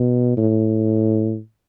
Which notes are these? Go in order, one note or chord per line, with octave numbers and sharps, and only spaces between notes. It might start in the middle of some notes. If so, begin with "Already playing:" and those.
Already playing: B2
A2